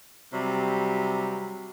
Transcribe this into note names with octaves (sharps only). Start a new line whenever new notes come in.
C3 F#3 G3